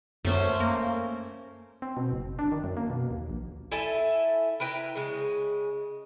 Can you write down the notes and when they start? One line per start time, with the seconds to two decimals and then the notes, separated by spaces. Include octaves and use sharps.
0.25 F#2 A3 C#4 C5
0.60 A#3
1.82 C4
1.97 B2
2.12 F#1
2.39 D4
2.52 D#3
2.64 F#2
2.77 A#3
2.90 B2
3.11 D#2
3.30 A#1
3.71 E4 A4 E5 G#5
4.60 E4 B4 G5 A#5
4.95 C#3 G#3